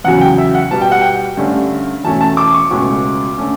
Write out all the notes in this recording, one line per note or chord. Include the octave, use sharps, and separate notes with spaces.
E2 C#3 F#3 F#5
G5
E5
F#5
B2 G3 B3 A5
G5
F#5
G5
G2 D3 A3 C#4
E2 B2 A3 C#4 A5
A5
D6
C#6
C#2 B2 A3 C#4
D3 A3 C#4